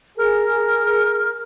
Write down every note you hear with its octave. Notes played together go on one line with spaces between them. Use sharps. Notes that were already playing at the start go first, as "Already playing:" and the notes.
G#4 A#4 F6